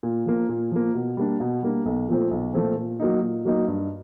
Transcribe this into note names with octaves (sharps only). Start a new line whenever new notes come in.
A#2
F3 A#3
A#2
F3 A#3
B2
G3 A#3 D4
B2
G3 A#3 D4
B1
A#2 F3 A3 C4
B1
A#2 F3 A3 C4
A#2
F#3 A#3 D#4
A#2
F#3 A#3 D#4
G2